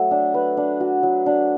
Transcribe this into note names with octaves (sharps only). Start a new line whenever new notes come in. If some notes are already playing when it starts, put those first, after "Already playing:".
Already playing: F#3 A3
D4
B4
D4
F#4
F#3
D4